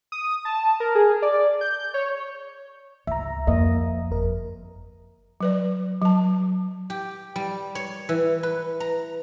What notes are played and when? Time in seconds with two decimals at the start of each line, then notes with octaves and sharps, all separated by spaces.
0.12 D#6
0.45 A5
0.80 A#4
0.95 G#4
1.22 D5
1.61 G6
1.94 C#5
3.07 C#2 E5 A#5
3.47 F2 A#3 D#5
4.11 G1 F2 A#4
5.41 F#3 B4 D5
6.02 F#3 A5
6.90 G4
7.36 G3
7.75 C#5
8.09 E3
8.43 B4
8.80 A#5